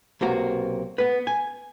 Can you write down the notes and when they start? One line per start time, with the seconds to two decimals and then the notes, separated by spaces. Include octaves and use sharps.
0.21 B1 C3 A#3 F#4 A#5
0.98 B3 B4
1.27 G#5